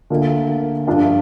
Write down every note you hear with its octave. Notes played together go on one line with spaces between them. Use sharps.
D2 D3 A#3 F4
G2 F3 D4 F4